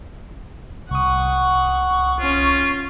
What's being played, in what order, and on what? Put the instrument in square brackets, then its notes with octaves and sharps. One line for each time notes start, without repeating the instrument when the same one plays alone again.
[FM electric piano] C2 D#6 [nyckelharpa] F#5 [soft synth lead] C#6
[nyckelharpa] C#4 [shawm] F4